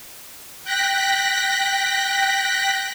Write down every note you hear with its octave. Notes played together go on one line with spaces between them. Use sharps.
G5 F#6 A#6 B6